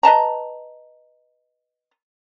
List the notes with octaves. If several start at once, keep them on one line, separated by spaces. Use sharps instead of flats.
B4 D#5 A5 A#5